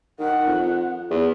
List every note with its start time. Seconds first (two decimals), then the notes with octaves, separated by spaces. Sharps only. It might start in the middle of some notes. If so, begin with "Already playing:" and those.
0.19 D#3 F#5
0.47 F2
1.11 E2 B3